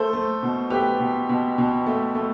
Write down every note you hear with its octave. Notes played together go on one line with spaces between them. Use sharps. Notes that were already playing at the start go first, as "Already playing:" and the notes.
Already playing: A3 A4 C5
A3
B2
A3 G4 B4
B2
B2
B2
A3
A3